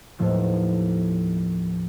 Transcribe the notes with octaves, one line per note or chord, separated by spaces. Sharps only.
D#2 A2 F3 A3 B3